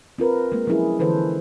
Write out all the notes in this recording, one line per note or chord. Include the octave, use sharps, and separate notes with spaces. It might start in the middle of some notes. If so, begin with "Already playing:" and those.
C4 F4 A#4 B4
G#3 A#3
F3 F#3 C#4 E4 G#4
D3 E3 A4 B4 C5